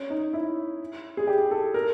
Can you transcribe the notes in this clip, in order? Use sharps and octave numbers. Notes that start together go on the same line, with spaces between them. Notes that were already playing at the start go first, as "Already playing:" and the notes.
Already playing: C#4
D#4
E4
G#4
G4
A4
A#4